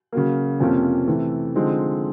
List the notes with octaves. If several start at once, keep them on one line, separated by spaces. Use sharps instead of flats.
C#3 F#3 A#3
F2 C3 F3 A#3 C#4
C3 E3 A3
D3 F3 G#3 C4 D#4